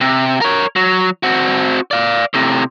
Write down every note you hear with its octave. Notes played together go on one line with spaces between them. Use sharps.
C3
A#4 C#5
F#3
C4 F#4
D5 F5
A2 C3